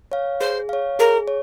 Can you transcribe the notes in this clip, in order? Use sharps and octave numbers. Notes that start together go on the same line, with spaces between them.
C#5 F5
G#4 C5
C#5 F5
G#4 A#4
C#5